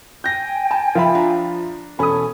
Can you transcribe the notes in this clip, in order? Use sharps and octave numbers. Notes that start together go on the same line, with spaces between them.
G5 G#5 G6 A#6
A5
F3 F4 E5 B5
D4 A#5
E1 C#4 A4 G#5 B5 D#6